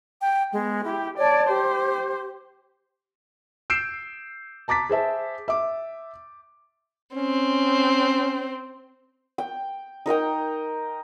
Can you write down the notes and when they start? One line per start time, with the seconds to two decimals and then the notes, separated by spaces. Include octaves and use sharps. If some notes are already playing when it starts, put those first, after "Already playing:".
0.21 G5
0.53 G#3 B3
0.85 E4 G4
1.18 C#5 D5 A5
1.49 G4 C5
3.70 E6 G6 C7 D7 E7
4.68 A5 A#5 D6 A6 B6
4.89 G#4 C5 E5 A5
5.48 E5 D6
7.16 C4 C#4
9.38 G5
10.06 D#4 A#4 D#5 G5